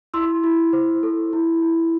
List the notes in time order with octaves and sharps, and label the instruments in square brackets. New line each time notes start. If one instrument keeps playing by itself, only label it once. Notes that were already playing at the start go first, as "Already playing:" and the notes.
[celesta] E4 C6 E6
E4
C5
A4
E4
E4